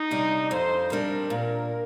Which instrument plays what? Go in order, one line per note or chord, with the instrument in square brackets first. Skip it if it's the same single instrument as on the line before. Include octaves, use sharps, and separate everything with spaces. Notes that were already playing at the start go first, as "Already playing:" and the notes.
Already playing: [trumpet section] D#4
[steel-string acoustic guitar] C3 G3 D4
[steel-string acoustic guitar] F2 [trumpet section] C5
[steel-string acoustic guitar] C3 G3 D4 [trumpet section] A#4
[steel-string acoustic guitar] A#2 [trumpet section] A#4